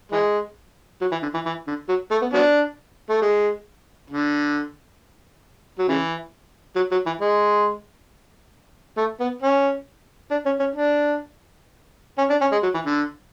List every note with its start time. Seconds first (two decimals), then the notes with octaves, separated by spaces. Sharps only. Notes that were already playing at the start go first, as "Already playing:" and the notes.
0.12 E3 G#3
1.01 F#3
1.11 E3
1.22 D3
1.34 E3
1.45 E3
1.67 D3
1.88 F#3
2.11 A3
2.22 B3
2.34 F#3 B3 D4
3.10 A3
3.22 G#3
4.10 D3
5.78 F#3
5.88 C#3 E3
6.76 F#3
6.91 F#3
7.06 E3
7.21 G#3
8.97 A3
9.20 B3
9.42 C#4
10.31 D4
10.45 C#4
10.59 C#4
10.75 D4
12.18 C#4
12.30 D4
12.41 C#4
12.52 G#3
12.63 F#3
12.74 E3
12.85 D3